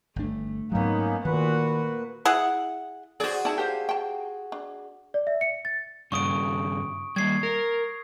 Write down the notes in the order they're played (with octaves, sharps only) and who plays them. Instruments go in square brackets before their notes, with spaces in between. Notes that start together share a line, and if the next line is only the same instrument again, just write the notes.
[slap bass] G1 D4 [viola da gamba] A3
[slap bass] G#2 F#3 [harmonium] A#3 C#4 D#4 [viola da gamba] B3
[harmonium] A#2 B4 [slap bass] D#3 [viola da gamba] F#4
[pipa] E4 G#4 F#5
[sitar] F#4 G#4 [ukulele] C5 D5
[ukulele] D#4 E4 [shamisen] D5 A5
[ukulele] G4 C5 F5
[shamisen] G5 A5
D4
[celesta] D5
E5
C#7
A6
[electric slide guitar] G2 C#3 G3 [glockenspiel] C#6 D#6 D7
[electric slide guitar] G3 A#3 [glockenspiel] G#6 C7
[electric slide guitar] A#4